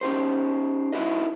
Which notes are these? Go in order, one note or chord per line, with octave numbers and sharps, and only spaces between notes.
C#4 D#4 G4 C5
D#4 E4 F#4 B4 D#5